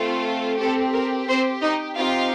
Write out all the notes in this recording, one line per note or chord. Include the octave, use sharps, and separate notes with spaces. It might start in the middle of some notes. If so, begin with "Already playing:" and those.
Already playing: A3 C4 F4 A4
C4 G4 A4
A#4
C4 C5
D#4 D#5
C4 D#4 F4 G4 F5